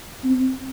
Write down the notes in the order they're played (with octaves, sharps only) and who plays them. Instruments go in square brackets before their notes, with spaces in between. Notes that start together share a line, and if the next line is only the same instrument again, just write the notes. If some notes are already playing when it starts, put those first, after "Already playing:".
[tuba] C4